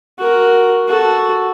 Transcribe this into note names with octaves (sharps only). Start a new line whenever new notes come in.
F#4 A#4
F#4 A4